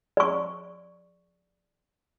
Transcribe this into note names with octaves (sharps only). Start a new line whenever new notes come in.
D5 C#6